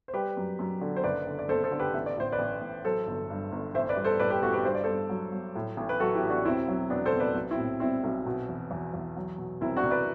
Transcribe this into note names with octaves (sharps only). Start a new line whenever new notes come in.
C5
G3 G4 B4
F#2
F#2
D3
C5
F#1 B4 D5
D3
D5
F#1 A4 C5
A4 C5
D3
G4 B4
A1 E5
D5
A2 C5
B4 D5
A1
A1
F#3 A4 C5
G1
G2
G1
A1 C5 E5
B4 D5
G3
A4 C5
A2 B4 D5
G4 B4
A1 F#4 A4
G4 B4
G2 C5
D5
G2 A4 C5
F#3
F#3
A2
A1
B4
F#3 F#4 A4
E4 G4
A1
D4 F#4
E1 C4 E4
F#3
E1 B3 D4
A4 C5
C3
B4 D5
B1
C4 E4
A2
G3 C4 E4
B1
B2
E2
E2
E2
F#3
B2
C2 C4 E4
D4 F#4
C2
B4 D5